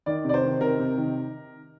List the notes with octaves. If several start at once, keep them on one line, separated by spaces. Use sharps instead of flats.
D#3 D5
C3
D5
C5
D#3
C3 A#4
C3
D#3